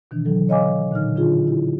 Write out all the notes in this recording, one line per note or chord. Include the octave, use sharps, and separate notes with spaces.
B2 D#3 E3 D4
D3 E3 F#3 A4
C#5 D#5 F5 G#5 D6
A#2 D3 D#4 F6
A#2 D3 D4 F4 G#4
E4 G4